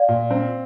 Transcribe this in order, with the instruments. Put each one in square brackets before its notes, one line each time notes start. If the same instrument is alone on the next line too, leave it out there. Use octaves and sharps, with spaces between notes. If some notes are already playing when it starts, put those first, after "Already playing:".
Already playing: [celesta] D5 F5
[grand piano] A#2
C4